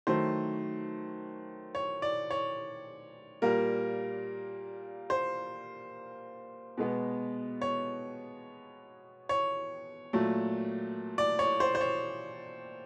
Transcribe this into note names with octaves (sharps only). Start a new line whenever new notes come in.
D#3 F#3 A3 C5
C#5
D5
C#5
A#2 G3 A#3 A#4
C5
B2 G#3 B3
C#5
C#5
A#2 F#3 A3
D5
C#5
C5
C5
C#5